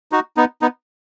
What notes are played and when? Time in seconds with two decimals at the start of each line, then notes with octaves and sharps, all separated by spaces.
0.12 D#4 F#4
0.37 B3 D#4
0.62 B3 D#4